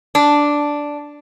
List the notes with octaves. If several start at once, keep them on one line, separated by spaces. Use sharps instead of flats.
D4